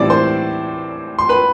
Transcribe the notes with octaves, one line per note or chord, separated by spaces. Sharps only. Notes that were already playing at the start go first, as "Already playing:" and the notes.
Already playing: A2 E3 G3 C4 E4 D5 D6
C5 C6
C6
B4 B5